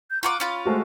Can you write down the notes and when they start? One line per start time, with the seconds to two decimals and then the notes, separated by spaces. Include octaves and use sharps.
0.10 G6
0.23 F4 F#5 A#5 C#6 D6
0.40 C#4 F4 F5 B5
0.66 G#3 A3 F#4 C5